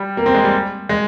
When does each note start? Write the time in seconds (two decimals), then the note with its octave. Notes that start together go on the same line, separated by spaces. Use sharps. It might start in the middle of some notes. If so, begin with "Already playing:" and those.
Already playing: G3
0.17 A#3
0.26 C4
0.34 G#3
0.44 G3
0.89 G#3